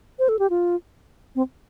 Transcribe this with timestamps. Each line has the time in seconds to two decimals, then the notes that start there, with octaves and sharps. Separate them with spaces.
0.19 C5
0.29 A4
0.39 G4
0.50 F4
1.35 C4